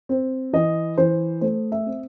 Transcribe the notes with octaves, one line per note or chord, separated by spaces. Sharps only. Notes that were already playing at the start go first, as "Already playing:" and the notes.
C4
E3 D#5
E3 C5
A3 C5
E5
C4